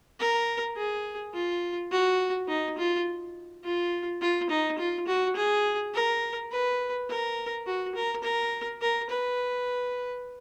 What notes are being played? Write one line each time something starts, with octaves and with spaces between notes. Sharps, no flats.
A#4
G#4
F4
F#4
D#4
F4
F4
F4
D#4
F4
F#4
G#4
A#4
B4
A#4
F#4
A#4
A#4
A#4
B4